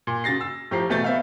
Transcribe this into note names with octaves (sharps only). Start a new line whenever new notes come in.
A#2
C#3 F#4 A6 A#6 C7
E6
A2 F3 G4 A#5 C7
E2 B2 A3 G6 A6
B3 E5 F5